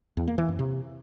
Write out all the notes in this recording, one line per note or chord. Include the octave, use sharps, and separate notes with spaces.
E2
A#3
E3
F#2
C3